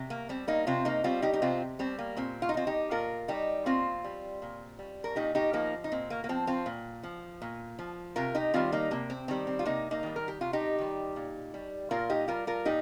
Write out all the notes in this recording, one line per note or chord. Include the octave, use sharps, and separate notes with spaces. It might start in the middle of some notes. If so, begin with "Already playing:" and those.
Already playing: C3
A#3
G3 C4
A#3 D#4
C3 C4 F4
A#3 D#4
G3 C4 F4
D#4 G4
D#4
C3 C4 F4
G3 C4
A#3
A#2 C4
F4
D#4
G3
C4 F4
D#4 G4
A#2 F4 A#4
G3 D#4 G4
A#2 C4 F4
G3
A#2
G3
A#4
A#2 D#4 G4
D#4 G4
F3 A#3 D#4
D#4
A#2 C4
A#3
A#3
F3 C4
C4 F4
A#2
F3
A#2
F3
C3 F4 A#4
D#4 G4
D#3 G3 C4 F4
A#3 D#4
C3 A#3
C4
D#3 G3 C4
C4
F4
C3 A#3 D#4
A#3 D#4
D#3 G3
A#4
G4
C3 F4
D#4 G4
D#3 G3
A#2
G3
A#2 F4 A#4
D#4 G4
G3 F4 A#4
F4 A#4
A#2 D#4 G4